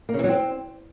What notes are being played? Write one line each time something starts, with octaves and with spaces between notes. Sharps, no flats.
A#3
C#3
E3
F#3
C4